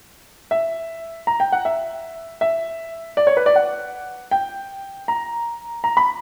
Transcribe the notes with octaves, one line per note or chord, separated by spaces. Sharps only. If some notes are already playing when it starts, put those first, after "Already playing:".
E5
A#5
G5
F#5
E5
E5
D5
C#5
B4
D5
F#5
G5
A#5
A#5
B5